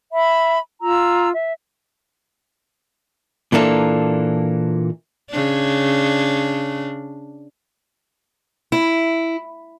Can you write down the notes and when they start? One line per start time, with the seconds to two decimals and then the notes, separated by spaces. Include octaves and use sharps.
0.13 E5 B5
0.81 F4 A#5 E6
1.34 E5
3.52 A#2 E3 A#3 D4 A4
5.30 C#3 D4
8.72 E4